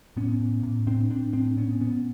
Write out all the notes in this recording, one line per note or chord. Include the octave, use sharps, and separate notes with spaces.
A2 B3 C#4
A2
A2
A2 C4 D4
A2 C4 D4
A2 C4 D4
A#2 B3 C#4
A#2 B3 C#4